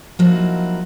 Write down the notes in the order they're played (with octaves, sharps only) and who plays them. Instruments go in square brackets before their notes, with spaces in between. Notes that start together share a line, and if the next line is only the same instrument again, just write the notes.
[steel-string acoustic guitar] F3 F#3 A#3 D#4 E4 F#4